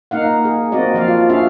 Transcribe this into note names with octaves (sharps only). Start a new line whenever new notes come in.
A#3 D#4 F5 F#5
G#4
A#3 C4 F#4 D5 D#5
F3 D5 F5
F4
C#4 D4 F#4 G#4 E5 F5